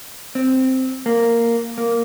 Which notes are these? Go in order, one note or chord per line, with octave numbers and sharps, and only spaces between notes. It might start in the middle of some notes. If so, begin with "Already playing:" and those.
C4
A#3
A#3